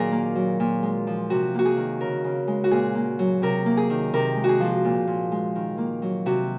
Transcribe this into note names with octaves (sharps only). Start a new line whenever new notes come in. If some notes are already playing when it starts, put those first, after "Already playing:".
Already playing: A#2 D#3 F#3 G#4 A#4
A#3
F#3
A#2
G#3
F3
C3 F#4
A#3 F#4
G#4
D#3
C#3 A#4
C#3
G#3
F#4
A#2 G#4
A#3
F#3
C3 A#4
A#3
G#4
D#3
C3 A#4
G#3
F#4 G#4
F3
A#2
A#2
G#3
D#3
A#3
F#3
C3 F#4